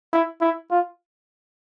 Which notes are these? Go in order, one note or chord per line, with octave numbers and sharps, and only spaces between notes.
E4
E4
F4